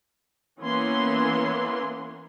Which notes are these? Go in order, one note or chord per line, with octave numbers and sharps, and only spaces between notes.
E3 A#3 B3 C#4 C6